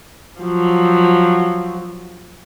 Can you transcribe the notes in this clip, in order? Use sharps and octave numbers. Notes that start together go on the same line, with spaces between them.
F3 F#3